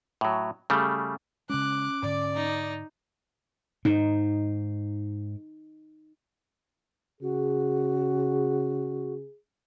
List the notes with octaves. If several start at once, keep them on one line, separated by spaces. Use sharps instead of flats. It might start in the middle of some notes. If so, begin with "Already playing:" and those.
A2 F#3
C#3 G3 A3
C#3 G#3 C#4 D6 F#6
G#2 D3 D5
D#4
G#2 D#4
C#3 F#4 G#4